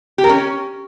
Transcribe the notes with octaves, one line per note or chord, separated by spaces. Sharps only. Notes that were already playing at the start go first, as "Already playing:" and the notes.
G4
A#4
C#4